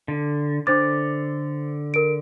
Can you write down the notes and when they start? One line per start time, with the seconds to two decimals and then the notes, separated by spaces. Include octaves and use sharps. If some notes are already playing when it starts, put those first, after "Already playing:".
0.08 D3
0.67 D3 D4 C5 D6 A6
1.94 A#4 D7